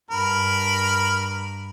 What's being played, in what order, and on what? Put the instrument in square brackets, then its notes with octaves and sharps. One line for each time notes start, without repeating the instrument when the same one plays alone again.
[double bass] G2 [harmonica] A#4 B5